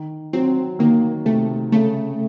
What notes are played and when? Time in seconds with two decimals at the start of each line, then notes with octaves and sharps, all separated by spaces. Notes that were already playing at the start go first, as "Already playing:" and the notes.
Already playing: D#3
0.33 F#3 C4
0.79 D#3 A#3
1.25 C3 A3
1.72 C#3 A3